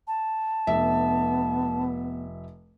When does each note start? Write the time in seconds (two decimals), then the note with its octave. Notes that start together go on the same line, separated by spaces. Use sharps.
0.07 A5
0.67 F1 B3 E5